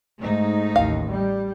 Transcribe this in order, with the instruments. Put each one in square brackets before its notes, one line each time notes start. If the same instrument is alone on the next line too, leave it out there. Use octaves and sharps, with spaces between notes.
[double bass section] G#2 [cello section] A3 D#4
[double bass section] A1 D#2 [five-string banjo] F5
[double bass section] G3